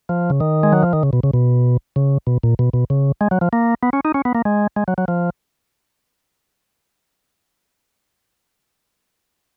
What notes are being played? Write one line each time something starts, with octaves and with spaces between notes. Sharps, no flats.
F3
C#3
D#3
G#3
F#3
F3
D#3
C#3
B2
C#3
B2
C#3
B2
A#2
B2
B2
C#3
G#3
F#3
F3
A#3
B3
C#4
D#4
C#4
B3
A#3
G#3
G#3
F#3
F#3
F3